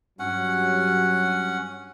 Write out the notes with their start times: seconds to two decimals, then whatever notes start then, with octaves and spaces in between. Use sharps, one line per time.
0.19 G2 F#3 C#4 F#5